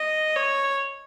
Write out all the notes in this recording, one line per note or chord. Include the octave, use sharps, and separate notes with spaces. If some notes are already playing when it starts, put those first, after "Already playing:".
Already playing: D#5
C#5